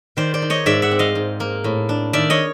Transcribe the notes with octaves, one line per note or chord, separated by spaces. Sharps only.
D#3 C5 D5
C5 D5
D#4
C#5 D#5
G#2 D5 E5
E5 F#5
C4
D#5 F5
G#2
A#3
A2
D4
D#3 D5 E5
C#5 D#5